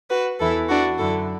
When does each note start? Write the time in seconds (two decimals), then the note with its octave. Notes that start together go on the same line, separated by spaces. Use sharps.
0.10 F#4 B4
0.40 E2 E3 E4 A4
0.69 D4 F#4
0.99 F#2 D3 E4 A4